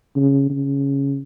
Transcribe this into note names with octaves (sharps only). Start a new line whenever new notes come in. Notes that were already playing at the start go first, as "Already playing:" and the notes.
C#3
C#3